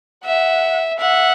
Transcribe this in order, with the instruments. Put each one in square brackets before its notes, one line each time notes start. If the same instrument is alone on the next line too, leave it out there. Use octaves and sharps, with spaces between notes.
[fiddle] E5 [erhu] F#5
[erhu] E5 [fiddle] F#5